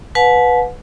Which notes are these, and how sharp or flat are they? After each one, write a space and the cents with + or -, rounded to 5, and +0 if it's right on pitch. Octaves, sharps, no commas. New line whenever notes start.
B4 +0 F#5 -35 A5 -40